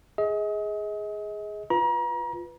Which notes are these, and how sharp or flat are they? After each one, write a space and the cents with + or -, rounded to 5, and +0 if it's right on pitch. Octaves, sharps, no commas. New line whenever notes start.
G#4 +0 D#5 +35
F4 +0 B4 +0 A#5 +35